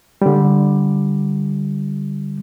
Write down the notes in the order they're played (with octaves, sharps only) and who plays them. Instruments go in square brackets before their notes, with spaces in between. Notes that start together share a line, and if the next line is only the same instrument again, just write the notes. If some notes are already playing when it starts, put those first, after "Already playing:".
[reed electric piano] D3 G3